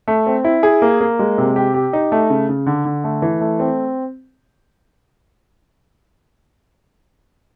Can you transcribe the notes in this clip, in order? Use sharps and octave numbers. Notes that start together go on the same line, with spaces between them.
A3
C4
E4
G#4
A#3
A#3
G#3
C3
G4
G4
D#4
A3
C#3
C#3
D3
D3
A3
E3
A3
C4